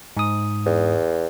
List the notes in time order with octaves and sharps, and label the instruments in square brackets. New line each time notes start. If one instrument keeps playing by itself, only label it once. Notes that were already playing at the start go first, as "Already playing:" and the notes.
[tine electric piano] G#2 D#6
[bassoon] E2